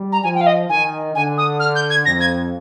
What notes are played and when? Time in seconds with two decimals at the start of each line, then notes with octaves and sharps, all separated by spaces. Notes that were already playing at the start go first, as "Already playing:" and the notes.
Already playing: G3
0.12 A#5
0.23 F3 G#5
0.35 G5
0.41 F5
0.47 D#5
0.69 D#3 G#5
1.15 D3 G#5
1.38 D#6
1.60 F6
1.75 G6
1.90 G#6
2.06 F2 A#6
2.20 G#6